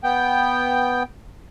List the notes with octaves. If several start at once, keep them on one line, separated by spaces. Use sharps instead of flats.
B3 G5